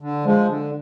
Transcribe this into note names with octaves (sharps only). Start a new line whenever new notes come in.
D3
F3 G#3
D3